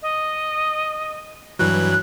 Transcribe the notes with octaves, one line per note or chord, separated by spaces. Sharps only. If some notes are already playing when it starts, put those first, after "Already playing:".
D#5
G2 E3 F#3 F#6